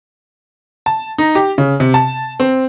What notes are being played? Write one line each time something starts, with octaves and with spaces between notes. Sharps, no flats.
A5
D#4
G4
C#3
C3
A5
C4